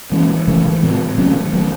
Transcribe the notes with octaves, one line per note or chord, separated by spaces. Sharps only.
E3 G#3 C#4
C#3 E3 A3
A2 G#3 C4
D#3 F#3 A3 C#4
D#3 F#3 A3